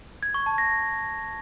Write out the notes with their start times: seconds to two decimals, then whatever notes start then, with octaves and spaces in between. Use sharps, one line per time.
0.23 G#6
0.34 C#6
0.46 A5
0.58 A#6